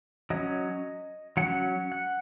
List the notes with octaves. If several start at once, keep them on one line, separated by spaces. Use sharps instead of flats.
F#3 C#4 D#5
F#3 C#4 F#5
F#5